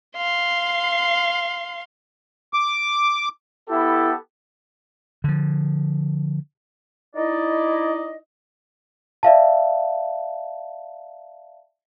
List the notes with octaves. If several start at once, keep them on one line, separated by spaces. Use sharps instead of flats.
F5 C6
D6
B3 E4 G4 A4
D3 F3
D#4 E4 D5 D#5
D5 E5 F5 A5